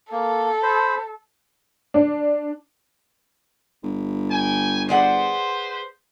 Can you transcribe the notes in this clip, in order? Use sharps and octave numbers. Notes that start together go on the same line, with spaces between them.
A#3 A4
C5 B5
D4
G1
G5 G#5
G#4 B4 C5 D5 F#5